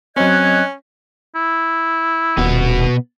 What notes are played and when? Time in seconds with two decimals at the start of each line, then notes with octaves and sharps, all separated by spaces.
0.17 F#3 C4 C#4 D#5 F#6 G#6
1.35 E4
2.38 D#1 B2 B3